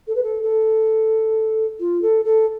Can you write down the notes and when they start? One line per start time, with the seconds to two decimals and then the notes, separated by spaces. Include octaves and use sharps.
0.07 A4
0.15 B4
0.23 A4
0.42 A4
1.79 F4
2.01 A4
2.25 A4